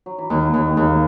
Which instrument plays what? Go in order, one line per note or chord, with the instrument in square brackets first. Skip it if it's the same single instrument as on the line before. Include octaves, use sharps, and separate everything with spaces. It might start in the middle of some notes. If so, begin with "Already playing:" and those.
[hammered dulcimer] F#3
E3
[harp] D#2 [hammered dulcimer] D#3
[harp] D#2 [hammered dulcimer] E3
[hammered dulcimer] D#3
[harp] D#2 [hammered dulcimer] C#3